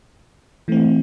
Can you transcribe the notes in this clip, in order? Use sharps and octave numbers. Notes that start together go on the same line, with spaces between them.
E3 A3 C4